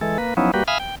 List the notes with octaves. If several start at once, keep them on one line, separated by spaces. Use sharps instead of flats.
E3 G#3 A4
A#3 B4
F3 F#3 B3 C#4 D#4 E4
G3 A#3 F#4 G4 B4
E5 F5 G#5 B5 D#6 F6
G5